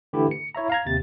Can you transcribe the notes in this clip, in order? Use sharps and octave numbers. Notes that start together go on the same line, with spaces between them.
D3 E3 A3 E4 G4
C#7
E4 C#5 E5 A#5
F5 A#5 G#6
D#2 C3 A6